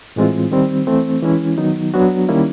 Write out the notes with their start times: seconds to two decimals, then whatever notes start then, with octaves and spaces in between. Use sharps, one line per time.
0.16 A2 E3 G#3 C4 F4
0.51 D#3 G3 C4
0.87 E3 A3 C4
1.22 E3 G#3 C#4 E4
1.58 D#3 F#3 B3 D#4
1.94 F#3 B3 D4 F#4
2.29 D#3 G3 A#3 C#4 E4